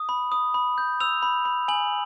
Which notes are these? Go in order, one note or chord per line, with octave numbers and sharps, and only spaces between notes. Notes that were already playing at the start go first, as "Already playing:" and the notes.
Already playing: D#6
B5
D#6
B5
G6
E6 F7
B5
B5
G#5 F#7